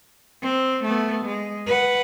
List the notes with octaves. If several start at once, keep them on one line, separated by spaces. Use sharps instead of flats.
C4
A3 B3
G#3
B4 F#5